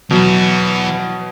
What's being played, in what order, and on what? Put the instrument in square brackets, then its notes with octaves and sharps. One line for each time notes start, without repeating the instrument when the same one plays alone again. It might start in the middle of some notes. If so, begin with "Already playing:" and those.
[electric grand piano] B2 F#3 [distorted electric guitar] E3 B3